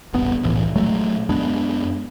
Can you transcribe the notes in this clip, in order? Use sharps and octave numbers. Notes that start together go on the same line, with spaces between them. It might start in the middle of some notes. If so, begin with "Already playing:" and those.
E1 A1 G2 B3
E1 C2 A2 E3
A#2 F#3 G#3 A3
F#2 G#3 B3 D4